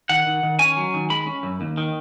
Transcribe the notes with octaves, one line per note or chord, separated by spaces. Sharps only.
D#3 F#5
D#3
D#3
C#4 G#5
F#3
D#3
G#3 B5
C#4
F#2
D#2
D#3